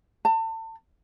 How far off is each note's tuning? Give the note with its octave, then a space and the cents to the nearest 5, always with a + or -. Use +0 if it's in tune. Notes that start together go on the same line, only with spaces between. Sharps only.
A5 +35